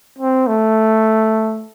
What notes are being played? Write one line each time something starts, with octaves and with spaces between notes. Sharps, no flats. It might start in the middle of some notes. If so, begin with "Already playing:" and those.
C4
A3